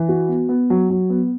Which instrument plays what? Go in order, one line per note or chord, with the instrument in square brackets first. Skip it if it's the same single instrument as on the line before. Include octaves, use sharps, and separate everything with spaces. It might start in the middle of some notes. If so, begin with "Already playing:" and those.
Already playing: [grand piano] E3
F#4
B3
B3
F#3
F#3
B3